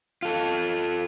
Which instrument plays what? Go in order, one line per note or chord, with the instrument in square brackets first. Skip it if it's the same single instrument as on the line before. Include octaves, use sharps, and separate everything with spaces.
[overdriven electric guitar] F4 A4